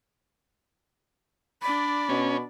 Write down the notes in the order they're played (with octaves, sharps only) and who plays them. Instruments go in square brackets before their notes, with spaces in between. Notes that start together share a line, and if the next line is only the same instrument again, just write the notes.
[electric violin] D4 D5 [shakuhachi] B5
[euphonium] B2 [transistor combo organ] C#4